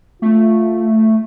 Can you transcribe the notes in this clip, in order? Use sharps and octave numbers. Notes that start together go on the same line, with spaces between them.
A3 F4